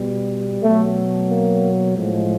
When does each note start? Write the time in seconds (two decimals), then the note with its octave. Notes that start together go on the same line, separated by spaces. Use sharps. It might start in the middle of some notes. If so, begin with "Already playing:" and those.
Already playing: B2 G3
0.63 B2 F#3 A3
1.29 A#3
1.96 A2 F3 G#3